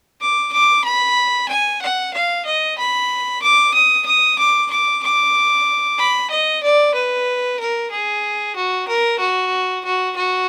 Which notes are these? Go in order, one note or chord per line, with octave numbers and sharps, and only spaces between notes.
D6
D6
B5
G#5
F#5
F5
D#5
B5
D6
D#6
D#6
D6
D6
D6
B5
D#5
D5
B4
A#4
G#4
F#4
A#4
F#4
F#4
F#4